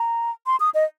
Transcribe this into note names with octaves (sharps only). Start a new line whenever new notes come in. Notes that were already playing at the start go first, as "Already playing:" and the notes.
Already playing: A#5
C6
D#6
D#5